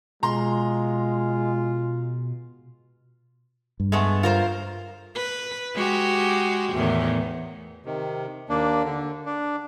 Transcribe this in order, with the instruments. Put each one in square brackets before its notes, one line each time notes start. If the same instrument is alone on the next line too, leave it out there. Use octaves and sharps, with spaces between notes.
[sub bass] B2 [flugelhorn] G#3 [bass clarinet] F4 [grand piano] A#5 C6
[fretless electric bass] G2
[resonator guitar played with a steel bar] G#3 A3 B3
F4 A#4 C5
[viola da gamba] B4
G#3 F#4 G4
E2 A2 D#3
[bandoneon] C3 D#3
D#2 A#3 D4
D3
D4